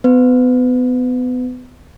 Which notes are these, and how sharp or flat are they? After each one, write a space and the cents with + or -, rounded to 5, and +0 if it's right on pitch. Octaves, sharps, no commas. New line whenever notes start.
B3 +30 B4 +30